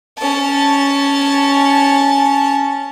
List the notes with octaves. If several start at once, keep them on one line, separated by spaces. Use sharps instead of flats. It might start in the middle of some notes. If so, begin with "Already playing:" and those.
C#4 A5